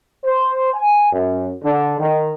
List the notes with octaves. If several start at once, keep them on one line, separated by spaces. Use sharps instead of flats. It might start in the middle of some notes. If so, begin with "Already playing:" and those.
C5
G#5
F#2
D3
D#3